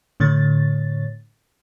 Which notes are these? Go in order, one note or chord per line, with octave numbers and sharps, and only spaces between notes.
A2 D3 C#5 A6